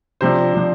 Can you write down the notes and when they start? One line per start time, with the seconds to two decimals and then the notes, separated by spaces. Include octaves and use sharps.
0.21 C3 F3 D4 C5
0.53 C3 F3 D4